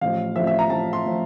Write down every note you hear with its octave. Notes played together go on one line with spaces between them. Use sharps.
A1 A2 F3 F5
A1 A2 F3 E5
E5
A#5
A1 A2 F3 A5
C6
A2 F3